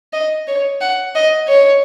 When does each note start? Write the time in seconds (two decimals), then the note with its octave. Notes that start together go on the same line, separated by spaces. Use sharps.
0.13 D#5
0.47 C#5
0.81 F#5
1.15 D#5
1.47 C#5